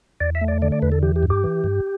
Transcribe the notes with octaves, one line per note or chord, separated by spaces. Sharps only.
E2 D5
E5
A3
D5
D3 D5
D5
E2 B4
A4
E3 G4
G4
G2
G4
E3
G2